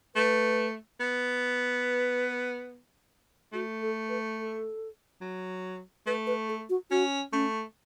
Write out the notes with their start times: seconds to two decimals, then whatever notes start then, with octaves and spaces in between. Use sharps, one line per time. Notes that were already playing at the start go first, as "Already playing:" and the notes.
0.16 A3 B4
1.00 B3
1.85 B4
3.53 A3 F#4
3.82 A4
4.09 B4
4.38 A4
5.21 F#3
6.06 A3 B4
6.27 B4
6.49 A4
6.70 F#4
6.91 C#4 F#4
7.33 A3 C#4